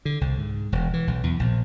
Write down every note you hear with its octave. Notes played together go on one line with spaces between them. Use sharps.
D3
C2
G#2
E1
E3
B1
E2
A#1